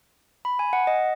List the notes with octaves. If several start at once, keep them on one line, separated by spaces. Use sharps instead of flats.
B5
G#5
F#5
D#5